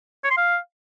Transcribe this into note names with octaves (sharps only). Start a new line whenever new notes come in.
C#5
C6
F5